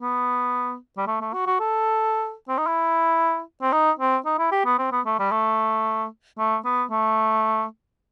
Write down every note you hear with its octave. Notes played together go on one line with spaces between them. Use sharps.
B3
G3
A3
A3
F#4
F#4
A4
C4
D#4
E4
C4
D#4
C4
D#4
E4
G4
B3
C4
B3
A3
G3
A3
A3
B3
A3